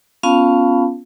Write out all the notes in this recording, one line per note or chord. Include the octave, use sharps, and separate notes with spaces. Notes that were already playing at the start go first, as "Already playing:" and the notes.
B3 C#4 F4 F5 A5 B5